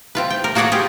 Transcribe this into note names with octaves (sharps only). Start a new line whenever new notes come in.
C4 F4 B4
G5
A#4
A#3 F#4 G#4 C#5 D5 F#5
F4 G4 G#4